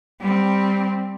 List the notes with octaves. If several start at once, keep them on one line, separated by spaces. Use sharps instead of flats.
G3 C4